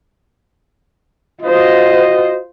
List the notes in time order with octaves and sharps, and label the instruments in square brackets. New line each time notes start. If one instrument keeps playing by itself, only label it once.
[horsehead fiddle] F4 C5 [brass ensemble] F#4 D#5